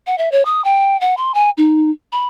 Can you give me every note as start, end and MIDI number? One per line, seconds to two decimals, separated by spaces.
0.07 0.17 78
0.18 0.29 76
0.32 0.45 73
0.45 0.64 87
0.64 0.99 79
1.01 1.15 78
1.17 1.32 84
1.34 1.50 80
1.57 1.91 63
2.12 2.28 83